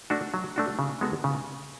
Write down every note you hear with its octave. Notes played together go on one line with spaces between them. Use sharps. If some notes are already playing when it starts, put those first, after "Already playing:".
A3 D4 F#4
F#3
A3 D4 F#4
C#3
G#3 B3 F#4 A4
C#3